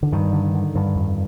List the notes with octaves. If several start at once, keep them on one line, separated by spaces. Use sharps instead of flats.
D3
G2 D#3
D3
D3
G2
F2